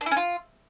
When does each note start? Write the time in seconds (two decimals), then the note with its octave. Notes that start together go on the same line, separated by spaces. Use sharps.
0.01 D4
0.06 E4
0.11 C#4
0.17 F4